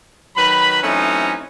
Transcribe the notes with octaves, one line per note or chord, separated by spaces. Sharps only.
D#3 F#3 B4 B5
E3 F#3 A3 C4 C#4 D#4